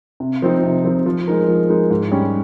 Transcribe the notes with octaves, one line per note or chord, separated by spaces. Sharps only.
C3
F3 C4 D#4
C3
F3 C4 D#4
F3
G#3 D#4 A#4
F3
G#3 D#4 A#4
G#2
G3 C#4